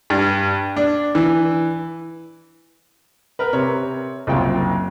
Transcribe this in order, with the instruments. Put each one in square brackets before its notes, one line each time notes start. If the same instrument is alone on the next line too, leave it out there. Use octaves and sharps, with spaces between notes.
[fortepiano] G2
D4
E3
A#4 B4
[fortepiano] C3 [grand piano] C#5
[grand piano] F#1 F#3 [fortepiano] C2 F4 G5